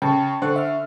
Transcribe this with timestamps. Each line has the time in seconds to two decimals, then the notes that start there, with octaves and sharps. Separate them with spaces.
0.02 C#3 G5 A5 C#6
0.42 D3 C5 C#6 F#6
0.56 E5 F6